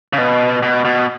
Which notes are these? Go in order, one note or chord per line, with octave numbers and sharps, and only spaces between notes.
C#3
B2
B2
B2